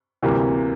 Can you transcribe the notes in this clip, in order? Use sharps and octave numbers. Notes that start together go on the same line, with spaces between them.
D2 C3 E3 G3 A#3